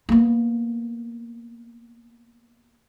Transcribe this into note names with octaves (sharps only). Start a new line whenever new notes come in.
A#3 B3